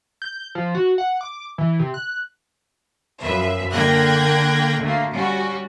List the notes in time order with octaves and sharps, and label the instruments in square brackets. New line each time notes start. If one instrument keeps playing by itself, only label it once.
[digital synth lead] G6
F3
F#4
F#5
D6
E3
C3
F#6
[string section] F#2 F3 B4 E5
D3 A#3 G5 F#6 G#6 A#6
D2 A3 A#3
G3 C#4 F#4